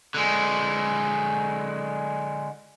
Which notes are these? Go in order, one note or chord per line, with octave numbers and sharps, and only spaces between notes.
D3 G#3